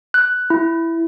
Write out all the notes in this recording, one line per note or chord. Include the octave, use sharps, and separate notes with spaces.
F#6
E4